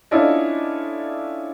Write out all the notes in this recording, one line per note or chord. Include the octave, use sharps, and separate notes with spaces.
C#4 D4 E4 F4 A4 D#5